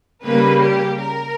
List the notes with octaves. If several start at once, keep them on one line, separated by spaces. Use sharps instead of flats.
C#3 G3 A#3 B4
G4
A#4